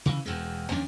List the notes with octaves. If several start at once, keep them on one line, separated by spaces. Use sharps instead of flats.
C#3 E3
E1 E2 G#3
D#2 F3 C#4 D4